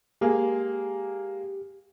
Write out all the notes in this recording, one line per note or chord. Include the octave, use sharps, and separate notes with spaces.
G#3 A#3 G4 G#4